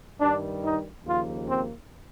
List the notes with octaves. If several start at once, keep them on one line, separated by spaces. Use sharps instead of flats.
G2 D#3 G3 D4
D#4
D#2 C#3 F3 A#3 F4
C4